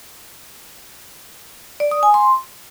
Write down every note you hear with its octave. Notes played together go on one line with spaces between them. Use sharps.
D5
D#6
G#5
C6